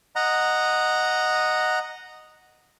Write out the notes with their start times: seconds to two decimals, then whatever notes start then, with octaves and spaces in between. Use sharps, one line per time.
0.16 D#5 F#5 A#5